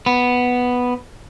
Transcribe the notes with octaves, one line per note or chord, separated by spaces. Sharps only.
B3